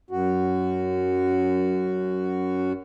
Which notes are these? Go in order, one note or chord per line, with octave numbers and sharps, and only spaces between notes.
F#2 F#4